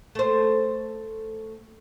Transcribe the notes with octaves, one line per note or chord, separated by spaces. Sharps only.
A3 C5